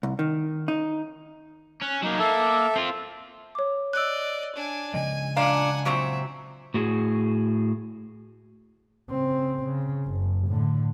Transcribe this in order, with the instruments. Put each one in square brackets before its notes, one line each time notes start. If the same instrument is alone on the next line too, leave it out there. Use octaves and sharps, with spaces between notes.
[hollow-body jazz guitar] C2
D#3
D#4
[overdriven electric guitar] C#4 [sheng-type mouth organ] F#6
[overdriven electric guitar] F#3 A#3 [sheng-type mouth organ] D#4
[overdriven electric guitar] A#3 [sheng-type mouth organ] A4 E5
[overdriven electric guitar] C4 F4
[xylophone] C#5 D6
[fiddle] D5 D#5 [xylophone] E6 F#6
[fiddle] D4 G#5
[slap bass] C#3 F3 G#3 [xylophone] D#5 [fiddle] G#5
[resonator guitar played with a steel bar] A#2 D4 F5 [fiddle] F#5 G#5 [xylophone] A#5
[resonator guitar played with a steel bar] A#2 F#3 C4 [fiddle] E5
[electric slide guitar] A2 F#4 G#4
[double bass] C#3 C4
C#3
F#1
A2 D3